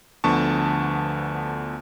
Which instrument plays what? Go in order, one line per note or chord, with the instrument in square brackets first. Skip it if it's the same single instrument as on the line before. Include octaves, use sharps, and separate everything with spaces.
[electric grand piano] D2 D3 F3 B3 A5 C#6